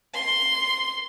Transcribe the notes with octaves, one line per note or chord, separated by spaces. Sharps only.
C6